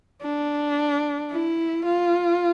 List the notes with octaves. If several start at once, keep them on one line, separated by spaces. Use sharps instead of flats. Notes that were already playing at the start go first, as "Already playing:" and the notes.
D4
E4
F4